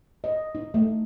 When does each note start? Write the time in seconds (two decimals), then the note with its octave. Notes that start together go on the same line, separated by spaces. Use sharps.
0.24 D#5
0.55 D#4
0.74 A3